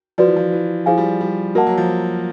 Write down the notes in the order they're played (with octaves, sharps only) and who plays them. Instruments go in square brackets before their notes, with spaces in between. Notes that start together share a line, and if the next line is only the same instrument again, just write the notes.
[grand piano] F3 [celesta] F#4 B4 D5
[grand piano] E3
F3
E3
[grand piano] F3 [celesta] E4 G#4 C5 F5 G#5
[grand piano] G3
G3
[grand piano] A#3 [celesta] F#4 A#4 D#5 F#5 A5
[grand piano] F#3
F3